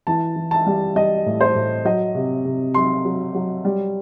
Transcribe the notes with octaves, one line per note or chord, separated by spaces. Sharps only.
E3 A5
E3
A5
G3
G3 D#5
A2
C5
A2
F#3 D#5
C3
C3
F#3 C6
F#3
F#3
G3